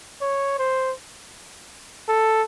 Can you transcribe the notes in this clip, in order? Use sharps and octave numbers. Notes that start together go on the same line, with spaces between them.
C#5
C5
A4